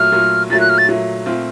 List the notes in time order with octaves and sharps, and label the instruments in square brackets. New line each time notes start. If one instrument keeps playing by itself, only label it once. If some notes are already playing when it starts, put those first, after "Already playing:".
Already playing: [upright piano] A#2 F#3 A3 [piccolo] F6
[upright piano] A#2 F#3 A3
[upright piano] A#2 F#3 A3 [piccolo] A6
[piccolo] F#6
F6
A6
[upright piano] A#2 F#3 A3
A#2 A3 C4 F4